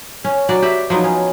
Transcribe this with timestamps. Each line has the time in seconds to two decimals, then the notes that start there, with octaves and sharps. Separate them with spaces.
0.24 C#4
0.49 F#3 F#4 D5
0.62 G4 B4 E5
0.90 F3 F#3 B3 D#4
1.04 C#4